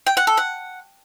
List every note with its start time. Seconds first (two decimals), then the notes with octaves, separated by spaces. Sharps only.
0.07 G5
0.17 F#5
0.27 A4
0.37 F#5